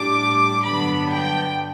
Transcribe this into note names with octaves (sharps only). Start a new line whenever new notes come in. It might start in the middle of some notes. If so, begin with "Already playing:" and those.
Already playing: A2 G3 D4 D6
G2 D3 F#3 B3 D4 B5
G5